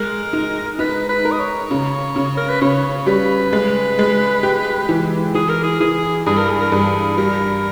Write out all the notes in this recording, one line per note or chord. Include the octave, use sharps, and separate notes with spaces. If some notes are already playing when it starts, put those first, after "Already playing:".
Already playing: G#3 A#4
D#4
D#4 B4
B4
A#4
D#5
C#5
C#3
C#3
A#4
B4
C#3 C#5
G3 B4
G#3
G#3
G4
E3
E3 G#4
A#4
G#4
E3 G#4
G2 G#4
A#4
G#4
A#4
G2 G#4
G3 A#4